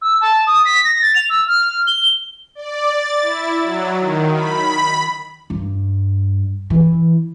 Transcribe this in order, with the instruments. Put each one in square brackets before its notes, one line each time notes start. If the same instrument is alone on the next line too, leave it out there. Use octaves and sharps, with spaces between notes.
[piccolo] E6
A5
D#6
B6
A#6
A6
F7
E6
F6
G7
[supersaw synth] D5
A6
E4
F#3
D#3
B5
[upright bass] G2
E3